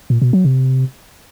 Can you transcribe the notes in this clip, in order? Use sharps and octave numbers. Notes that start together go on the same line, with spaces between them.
A#2
B2
F#3
C3